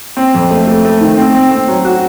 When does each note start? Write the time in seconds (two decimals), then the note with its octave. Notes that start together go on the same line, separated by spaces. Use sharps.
0.17 C4
0.34 F2
0.51 A3
0.67 A3
0.85 A3
1.01 D#3
1.17 C4
1.35 C4
1.51 C4
1.68 F#3
1.85 F#4